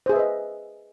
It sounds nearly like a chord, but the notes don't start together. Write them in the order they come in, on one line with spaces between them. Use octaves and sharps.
C5 G#4 E5 B4 D#5